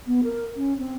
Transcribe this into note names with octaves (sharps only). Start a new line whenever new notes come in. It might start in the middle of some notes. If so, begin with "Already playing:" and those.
B3
A#4
C#4
C4